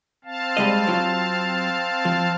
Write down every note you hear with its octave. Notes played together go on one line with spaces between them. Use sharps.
C4 F5 A5
G3 G#3 D#5
F#3 F4
F3